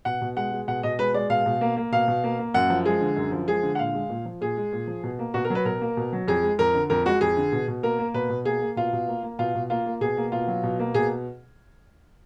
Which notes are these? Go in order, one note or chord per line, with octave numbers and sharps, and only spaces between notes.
B2 F#5
B2
G#3 F#5
G#3
B2 F#5
B2 D#5
G#3 B4
G#3 D5
B2 F5
B2
A#3
A#3
B2 F5
B2
A#3
A#3
F#2 F#5
F3
G#3 G#4
D3
F#2
F3
G#3 G#4
D3
F#5
A#2 F5
G#3
A#2
F3
A#2 G#4
G#3
A#2
F3
B2
A#3
B2 F#4
A#4
F#3
B4
B2 A#4
A#3
B2
F#3
F2 G#4
G#3
F2 A#4
D3
F2 A#4
G#3 F#4
F2 G#4
D3
B2
B2
A#3 A#4
A#3
B2 B4
B2
A#3 G#4
A#3
B2 F4
B2
A#3
A#3
B2 F4
B2
A#3 F4
A#3
B2 G#4
A#3
B2 F4
F#3
B2
A#3
B2 G#4